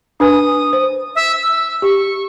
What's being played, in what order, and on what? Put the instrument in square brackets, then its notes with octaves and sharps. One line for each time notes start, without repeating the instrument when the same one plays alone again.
[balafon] D4 B4 G#5 [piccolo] D#6
[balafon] C5
[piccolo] E5
E6
[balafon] G4 [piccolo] C#6